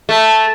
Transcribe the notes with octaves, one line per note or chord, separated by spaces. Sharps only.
A3